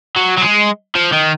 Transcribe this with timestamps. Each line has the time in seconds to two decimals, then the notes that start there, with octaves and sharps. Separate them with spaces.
0.16 F#3
0.38 F#3
0.42 G#3
0.95 F3
1.12 D#3